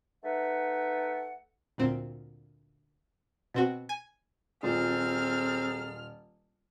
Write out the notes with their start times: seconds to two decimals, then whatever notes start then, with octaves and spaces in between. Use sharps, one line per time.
0.23 A3 D#4 B4 E5 F#5
1.78 D2 A#2 C4
3.54 B2 C4 F#4
3.89 G#5
4.63 D#1 F#3 C4 F4 G#4 A4 F6